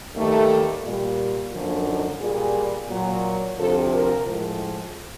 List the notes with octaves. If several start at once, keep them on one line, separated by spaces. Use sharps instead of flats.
D#2 D#3 G3 A3
A#2 G3
F#2 D3 F3 A#3
D#4
A#2 G3 G#4
A#2 F#3
D2 C3 F3 A4
A#4
A2 F3 G#3